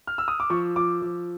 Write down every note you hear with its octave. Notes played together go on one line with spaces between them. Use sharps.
F6
E6
D#6
D6
F3 C#6
F3 D6
F3